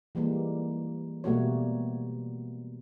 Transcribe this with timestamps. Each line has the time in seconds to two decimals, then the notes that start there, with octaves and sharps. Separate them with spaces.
0.15 E3 G3 G#3 A#3
1.24 B2 G3 A3 A#3 F#4 C#5